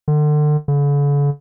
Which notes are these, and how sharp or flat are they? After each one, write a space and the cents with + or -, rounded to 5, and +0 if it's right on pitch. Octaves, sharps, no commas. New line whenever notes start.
D3 +35
D3 -45